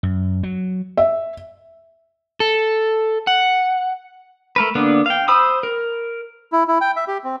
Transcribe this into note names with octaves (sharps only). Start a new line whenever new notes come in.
F#2
F#3
E5
A4
F#5
A3 A#4 B4
D3 A#3 B3 D4
F5 G5
C5 B5 D#6 E6
A#4
E4
E4
G5
E5
G4
C4